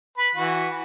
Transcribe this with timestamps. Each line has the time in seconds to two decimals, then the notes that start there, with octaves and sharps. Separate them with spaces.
0.18 B4 B5
0.35 E3 F#4